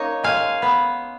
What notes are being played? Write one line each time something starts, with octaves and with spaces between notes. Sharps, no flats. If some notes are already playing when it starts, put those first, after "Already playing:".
Already playing: A#3 C#4 D#4 C#5
G#3 F5 G#5
B3